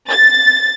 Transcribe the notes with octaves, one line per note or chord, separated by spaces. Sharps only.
A6